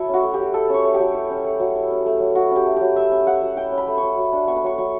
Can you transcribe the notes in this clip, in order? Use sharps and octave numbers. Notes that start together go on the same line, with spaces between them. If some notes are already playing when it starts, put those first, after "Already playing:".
Already playing: F#3 E4 A4
C#4 F#4
A3
G4
F#3
E4 A4
C#4 C#5
A3
G4
F#3
E4
C#4
A3
F#3
E4
C#4
A3
F#3
E4 F#4
C#4 G4
A3
F#3 G4
E4 E5
C#4
A3 F#5
F#3
E4 G5
C#4
B5
A3
C#6
F#3
F#3
D4
B3 C#6
B5
F#3 C#6
F#3 C#6